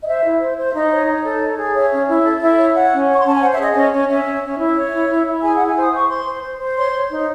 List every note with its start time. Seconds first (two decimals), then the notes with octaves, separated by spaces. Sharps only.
0.02 D#5
0.06 C5 E5
0.24 E4
0.40 C5
0.57 C5
0.68 E5
0.73 D#4 D#5
0.90 C#5
1.07 D#4
1.24 A4
1.40 C#5
1.58 G#4
1.74 C#5 E5
1.91 C#4
2.08 E4
2.24 A4
2.41 E4 E5
2.57 C#5
2.75 C#5 F#5
2.92 C#4
3.08 C#5 C#6
3.20 C6
3.25 C#4 A5
3.34 G#5
3.41 C5 F#5
3.52 E5
3.58 G#4
3.64 D#5
3.74 C#4 D#5
3.92 C#4
4.08 C#4 E5
4.25 C#4
4.42 C#4
4.58 E4
4.76 C#5
4.92 E4
5.09 E4
5.26 E4
5.42 G#4 G#5
5.55 E4 F#5
5.67 G#5
5.76 C5
5.82 D#6
5.93 C5 C#6
6.09 C5 C6
6.26 C5
6.43 C5
6.59 C5
6.77 C#5 C6
6.93 C#5
7.11 D#4